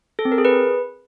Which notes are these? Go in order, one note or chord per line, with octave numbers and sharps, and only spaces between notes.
A4
C4
A#4
G#4
B4